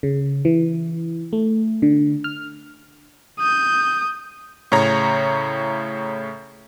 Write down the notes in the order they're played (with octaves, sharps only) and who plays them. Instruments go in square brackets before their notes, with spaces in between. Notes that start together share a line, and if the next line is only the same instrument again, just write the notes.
[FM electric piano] C#3
E3
A3
D3
F6
[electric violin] D#6 G6
[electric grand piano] A2 C#3 C#5 A#5